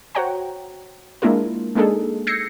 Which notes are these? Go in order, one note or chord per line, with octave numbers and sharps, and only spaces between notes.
F#4 C5 C#5 F#5 G5 A#5
G#3 A#3 D4 E4 F4 A#4
G#3 A#3 D4 D#4 G#4 A4
E6 G6 G#6 A#6 C7 C#7